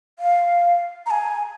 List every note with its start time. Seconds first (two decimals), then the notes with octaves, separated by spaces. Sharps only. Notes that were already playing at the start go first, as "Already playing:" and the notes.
0.19 F5
1.06 A#5
1.10 G#5